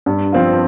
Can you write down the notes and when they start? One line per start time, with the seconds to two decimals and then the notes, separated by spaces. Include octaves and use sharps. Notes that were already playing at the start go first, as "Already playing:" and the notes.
0.06 G2
0.32 F3 C4 F4